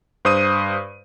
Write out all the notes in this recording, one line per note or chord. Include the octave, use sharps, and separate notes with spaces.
G2 C5 D#6 D#7